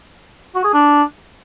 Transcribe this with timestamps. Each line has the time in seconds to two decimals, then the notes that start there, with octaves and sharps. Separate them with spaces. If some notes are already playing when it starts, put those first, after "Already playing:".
0.55 F#4
0.65 G#4
0.74 D4